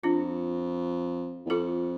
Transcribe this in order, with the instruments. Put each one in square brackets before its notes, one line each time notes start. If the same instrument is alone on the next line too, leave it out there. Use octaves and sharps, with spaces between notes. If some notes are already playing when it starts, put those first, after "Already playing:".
[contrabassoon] F2 [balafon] D4 F4
[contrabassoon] E2
[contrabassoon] F2 [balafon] F4 A4